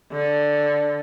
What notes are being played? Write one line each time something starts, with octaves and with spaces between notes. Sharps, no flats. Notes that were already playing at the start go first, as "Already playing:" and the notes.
D3